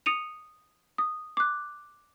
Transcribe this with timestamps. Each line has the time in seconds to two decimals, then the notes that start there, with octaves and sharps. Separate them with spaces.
0.06 D#6 C#7 D#7 F7
0.98 D#6
1.37 D6 F#6